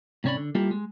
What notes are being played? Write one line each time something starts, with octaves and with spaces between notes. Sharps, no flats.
G#2 C3 C#4 C#5 D5 B5
D3
G3 A#3 E4 F4 G4 A4
G#3